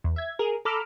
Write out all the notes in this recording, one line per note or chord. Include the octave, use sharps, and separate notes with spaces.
E2
E5 G#6
G#4 A#4
A4 A#5 B5 D6 E6 F6